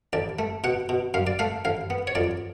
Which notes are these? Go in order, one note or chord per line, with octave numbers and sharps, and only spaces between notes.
A1 D5
A3
B2 F#5
B2
F#2 F5
D5
A3 F5
A1 F5
B3
C#5
F2 D5